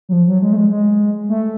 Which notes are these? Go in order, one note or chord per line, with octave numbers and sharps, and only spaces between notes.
F#3
F3
F#3
G#3
A3
G#3
G#3
A3